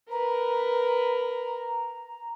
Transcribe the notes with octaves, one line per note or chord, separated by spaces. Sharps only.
A#4 B4 A#5